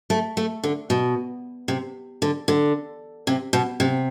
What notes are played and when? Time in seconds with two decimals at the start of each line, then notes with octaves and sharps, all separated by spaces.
0.10 A3
0.37 A3
0.64 D3
0.90 B2
1.68 C3
2.22 D3
2.48 D3
3.27 C3
3.53 B2
3.80 C3